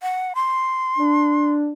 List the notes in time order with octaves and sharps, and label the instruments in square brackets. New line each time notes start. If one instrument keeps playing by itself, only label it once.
[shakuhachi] F#5
C6
[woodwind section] D4